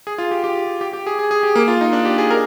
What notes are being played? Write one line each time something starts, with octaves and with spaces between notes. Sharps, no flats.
G#4
F4
G4
G4
G4
G4
G#4
G#4
G#4
G4
A#3
F4
D#4
D4
G4
G#4
A#4